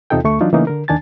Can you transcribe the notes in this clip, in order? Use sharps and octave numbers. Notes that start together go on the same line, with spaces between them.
E2 C3 D#4 F4 A4 G5
D2 A3 C#6
E3 F#3 D4 D#4 F4
C#3 E3 A3 A#3 C#4 D#4
D3 A#4
D#2 D#3 D4 G#5 A5 A6